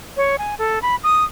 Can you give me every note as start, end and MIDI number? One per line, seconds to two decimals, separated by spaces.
0.17 0.36 73
0.38 0.55 80
0.59 0.79 69
0.82 0.95 83
1.03 1.24 87